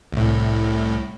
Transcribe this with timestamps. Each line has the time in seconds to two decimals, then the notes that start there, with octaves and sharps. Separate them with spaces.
0.12 C2 A2